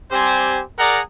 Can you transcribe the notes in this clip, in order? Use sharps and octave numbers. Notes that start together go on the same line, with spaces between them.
G3 C4 G4 C5 G#5
G#4 A#4 D5 F#5 A#5